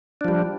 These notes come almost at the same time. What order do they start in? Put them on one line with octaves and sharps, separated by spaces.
D4 F3 G3